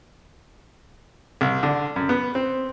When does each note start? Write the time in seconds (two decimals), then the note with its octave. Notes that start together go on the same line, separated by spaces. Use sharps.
1.41 C2
1.63 D3
1.96 F#2
2.09 B3
2.35 C4